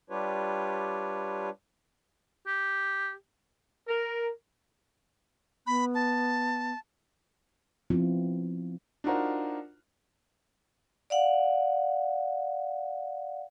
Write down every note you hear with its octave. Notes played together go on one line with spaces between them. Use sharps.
G3 D4 F4 G4 B4 C#5
G4
A#4
B3 B5
A5
F3 B3 C4 E4 F4
D4 D#4 F4 F#4 A#4 C5
D5 F5 F#5